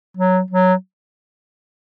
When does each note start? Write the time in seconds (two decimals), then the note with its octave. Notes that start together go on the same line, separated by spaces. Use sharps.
0.17 F#3
0.50 F#3